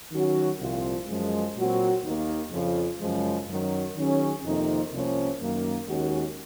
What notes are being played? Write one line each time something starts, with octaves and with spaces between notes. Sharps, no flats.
D#3 F#3 C#4 F#4
C2 A#2 F3 C4 F4
F#2 F3 G#3
A#2 F#3 C4 F#4
D#2 D#3 A#3
F2 C#3 F3
F#2 C#3 F3 G#3
F#2 D#3 F#3
D#3 F#3 C#4 G#4
F2 C3 D#3 A#3 D#4
C2 C3 F3 A#3 C#4
F#2 D#3 A#3
D#2 D#3 G#3 C#4 F#4